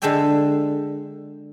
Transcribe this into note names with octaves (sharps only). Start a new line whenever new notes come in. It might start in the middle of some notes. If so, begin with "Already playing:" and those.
D3 G#3 A4 E5 G5 G#5